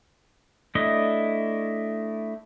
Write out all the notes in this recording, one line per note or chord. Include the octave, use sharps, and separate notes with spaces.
A3 D4 E4 D#5